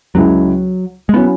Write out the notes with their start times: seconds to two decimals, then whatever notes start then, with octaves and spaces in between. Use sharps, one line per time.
0.15 C#2 C#3 F#3 G#3 E4
1.09 G#3
1.14 F#3 B3 C#4 E4